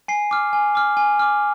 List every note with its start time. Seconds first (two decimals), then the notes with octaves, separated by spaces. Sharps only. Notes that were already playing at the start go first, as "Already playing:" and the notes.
0.08 G#5 C7
0.31 D6 F6
0.53 G#5
0.75 D6 F6
0.97 G#5
1.19 D6 F6